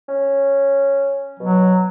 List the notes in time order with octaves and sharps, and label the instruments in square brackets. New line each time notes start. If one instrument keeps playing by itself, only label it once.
[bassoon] C#4
[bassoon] B2 [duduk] F#3